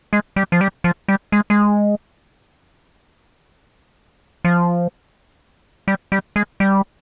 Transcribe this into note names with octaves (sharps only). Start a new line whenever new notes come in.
G#3
G3
F3
G3
F3
G3
G#3
G#3
F3
G3
G3
G#3
G3